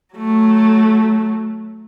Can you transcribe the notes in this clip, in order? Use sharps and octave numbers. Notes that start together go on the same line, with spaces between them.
F#3 A3